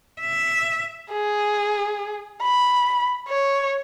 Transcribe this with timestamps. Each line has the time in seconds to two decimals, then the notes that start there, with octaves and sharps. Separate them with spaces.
0.21 E5
1.12 G#4
2.42 B5
3.29 C#5